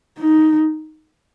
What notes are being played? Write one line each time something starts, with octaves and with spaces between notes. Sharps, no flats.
D#4